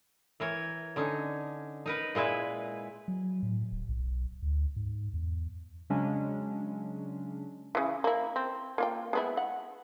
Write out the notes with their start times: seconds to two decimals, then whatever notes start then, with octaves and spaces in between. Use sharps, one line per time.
0.40 E3 A#4 C#5
0.96 D3 C#4 D#4
1.86 D#4 A#4 B4
2.15 A#2 G#3 E4 B4
3.08 F#3
3.43 A2
3.72 D1
3.89 B1
4.43 D2
4.76 G#2
5.14 E2
5.90 C#3 F#3 G#3 C#4 D4
7.75 C#3 E3
8.04 A#3 E4
8.36 C4
8.78 A#3 F4 G5
9.13 G#3 B3 E4
9.37 F#5